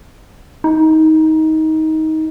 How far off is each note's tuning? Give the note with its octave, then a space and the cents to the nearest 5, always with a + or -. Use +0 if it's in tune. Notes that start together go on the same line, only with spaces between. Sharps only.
D#4 +20